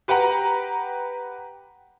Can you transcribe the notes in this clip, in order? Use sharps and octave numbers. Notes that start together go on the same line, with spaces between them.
G4 B4 F#5 G5 A#5